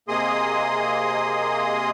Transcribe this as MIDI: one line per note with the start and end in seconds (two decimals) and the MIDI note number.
0.08 1.90 48
0.08 1.90 58
0.08 1.90 68
0.08 1.90 75
0.08 1.90 84
0.08 1.90 87